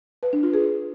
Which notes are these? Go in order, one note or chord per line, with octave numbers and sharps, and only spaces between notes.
B4
D4
F4
G#4